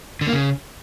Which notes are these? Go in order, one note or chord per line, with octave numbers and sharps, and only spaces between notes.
D3
A#3
C#3